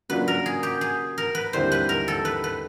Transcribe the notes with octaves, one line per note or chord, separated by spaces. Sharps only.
C#3 F#3 A#3 D4 F4 B4
A#4
G#4
G4
G#4
A#4
B4
D#2 D3 G3 C4 E4 C5
B4
A#4
A4
B4
B4